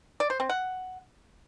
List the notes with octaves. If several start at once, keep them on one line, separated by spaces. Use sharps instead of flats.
D5
C5
C4
F#5